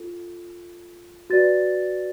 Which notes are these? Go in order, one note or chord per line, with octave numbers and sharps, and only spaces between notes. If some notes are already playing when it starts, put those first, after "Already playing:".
Already playing: F4 A4
F#4 B4 D5 A6